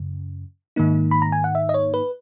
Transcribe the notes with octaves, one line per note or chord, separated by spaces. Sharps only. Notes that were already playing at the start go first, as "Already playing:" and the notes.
Already playing: F#2 C#3
G#2 D#3 A#3 D#4
B5
A#5
G#5
F#5
E5
D#5
C#5
B4